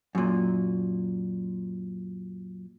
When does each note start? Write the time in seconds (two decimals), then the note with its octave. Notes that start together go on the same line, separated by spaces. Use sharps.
0.15 F#2 A#2